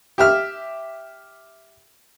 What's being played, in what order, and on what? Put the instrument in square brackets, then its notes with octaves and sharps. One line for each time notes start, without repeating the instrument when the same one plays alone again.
[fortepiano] G4 E5 F6